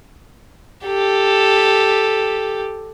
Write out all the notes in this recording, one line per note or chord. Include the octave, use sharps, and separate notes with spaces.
G4 A4